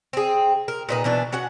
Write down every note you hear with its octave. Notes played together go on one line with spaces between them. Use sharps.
C4 G#4
A#4
A#2 D#4 B4
B2 E3 D4
C#4 F#4 F#5